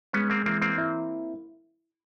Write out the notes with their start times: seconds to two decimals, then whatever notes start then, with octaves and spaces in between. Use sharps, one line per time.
0.13 G#3 B3 C#4
0.30 A#3 C4
0.45 E3 A#3 C4
0.62 A#3 C4
0.77 E4